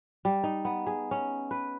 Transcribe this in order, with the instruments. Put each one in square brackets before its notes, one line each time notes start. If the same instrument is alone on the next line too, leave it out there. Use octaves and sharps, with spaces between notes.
[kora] G3
D#4
B3
G#4
C#4
B4